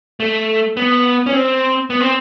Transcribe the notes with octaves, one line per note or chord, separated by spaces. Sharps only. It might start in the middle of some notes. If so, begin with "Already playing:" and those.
A3
B3
C#4
C4
B3
C4